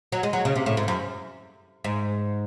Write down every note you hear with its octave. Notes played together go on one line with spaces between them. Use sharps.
F#3
G#3
F#3
C#3
C3
A2
G#2
F#2
G#2